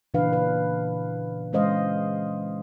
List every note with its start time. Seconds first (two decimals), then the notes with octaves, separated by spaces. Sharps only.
0.14 A#2 C#3 E3 D4 B4 F5
0.33 B4
1.53 E3 G#3 C#4 C5 D#5 F5